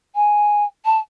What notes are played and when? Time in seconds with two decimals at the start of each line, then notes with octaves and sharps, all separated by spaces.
0.15 G#5
0.85 A5